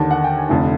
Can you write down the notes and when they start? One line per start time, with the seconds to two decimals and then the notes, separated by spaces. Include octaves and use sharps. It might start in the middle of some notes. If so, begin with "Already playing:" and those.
Already playing: D#2 D3 A5
0.11 F#5
0.24 G5
0.37 G#5
0.49 F1 F2 D3 A5